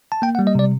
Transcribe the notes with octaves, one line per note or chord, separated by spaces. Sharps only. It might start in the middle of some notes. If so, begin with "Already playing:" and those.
A5
A#3 G5
F#5
G3
D#5
C3 D5